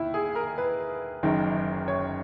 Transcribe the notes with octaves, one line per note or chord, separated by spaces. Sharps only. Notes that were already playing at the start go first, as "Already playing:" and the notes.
Already playing: D#2 E4
G#4
A#4
B4
F#1 F#2 D#3
C#5